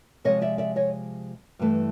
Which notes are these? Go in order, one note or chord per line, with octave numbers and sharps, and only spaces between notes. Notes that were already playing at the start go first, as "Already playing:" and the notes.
C3 F3 G#3 C#5 D#5
D5 E5
D5 E5
C#5 D#5
G2 E3 A3